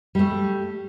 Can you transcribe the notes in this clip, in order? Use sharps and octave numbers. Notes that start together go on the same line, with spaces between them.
G3 A3